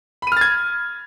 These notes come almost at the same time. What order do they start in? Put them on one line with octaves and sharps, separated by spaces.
B5 D#7 F6 A6 G#6